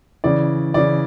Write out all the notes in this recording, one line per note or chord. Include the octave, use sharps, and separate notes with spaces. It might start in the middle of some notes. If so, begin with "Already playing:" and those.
C#3 E3 D5
C#3 E3 D5